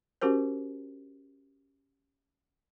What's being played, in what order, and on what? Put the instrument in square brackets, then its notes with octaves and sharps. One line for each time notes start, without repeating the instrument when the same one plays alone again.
[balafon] C#4 F#4 G4 A#4 C5